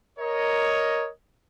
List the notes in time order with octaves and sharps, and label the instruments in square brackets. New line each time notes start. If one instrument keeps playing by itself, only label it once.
[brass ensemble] A#4 C#5 D#5